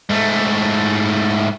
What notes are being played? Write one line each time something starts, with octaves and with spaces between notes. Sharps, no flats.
G#2 A3